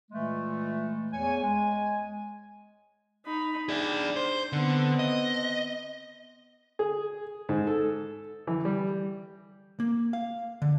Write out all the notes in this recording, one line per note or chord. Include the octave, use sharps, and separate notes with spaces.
A#2 E3 G#3 A3
E2 C#5 G#5
G#3 G#5
D#4 B5
D4 G#4 D5
C5
D3 B3 C4
D#5
G#4
G#2
A4
E3
G3
A#3
F5
D3